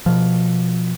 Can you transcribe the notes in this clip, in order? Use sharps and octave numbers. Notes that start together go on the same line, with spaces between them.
B2 F3